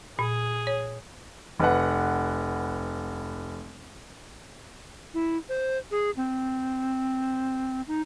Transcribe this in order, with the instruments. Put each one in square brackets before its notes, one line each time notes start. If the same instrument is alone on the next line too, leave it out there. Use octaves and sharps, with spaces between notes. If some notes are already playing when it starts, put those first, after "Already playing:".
[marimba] A#2 [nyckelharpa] G#4
[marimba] C#5
[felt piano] F1 B4 F#5
[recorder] E4
C5
G#4
C4
D#4